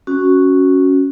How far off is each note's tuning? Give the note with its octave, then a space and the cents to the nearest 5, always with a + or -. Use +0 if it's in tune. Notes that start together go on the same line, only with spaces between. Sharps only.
C#4 +0 F#4 +0